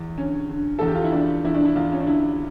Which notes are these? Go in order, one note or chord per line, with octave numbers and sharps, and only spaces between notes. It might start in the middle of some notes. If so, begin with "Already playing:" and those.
Already playing: E2
D3 C#4
D3
E2 A4
G4
F4
E4
E2 D4
E2 E4
D4
E4
E2 F4
C#4
D4
D3 E4